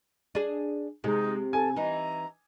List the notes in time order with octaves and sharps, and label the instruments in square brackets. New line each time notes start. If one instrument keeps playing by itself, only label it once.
[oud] D4 G#4
[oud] C3 [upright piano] G#3 [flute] D#4
[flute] A4 [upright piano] G#5
[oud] E3 D#4 [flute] A#5